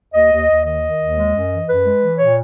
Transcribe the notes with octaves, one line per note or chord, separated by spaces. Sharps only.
D#2 D#5
D#2
D#2
D#3 D#5
D#3
D#2
G#3
F#2
E3
F#2 B4
G#3
E3
A#2 C#5